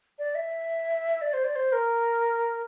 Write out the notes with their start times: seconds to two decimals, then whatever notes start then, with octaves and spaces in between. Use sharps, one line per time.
0.19 D5
0.35 E5
1.22 D5
1.34 C5
1.44 D5
1.56 C5
1.73 A#4